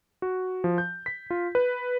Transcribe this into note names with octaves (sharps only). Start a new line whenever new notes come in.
F#4
F3
G6
B6
F4
B4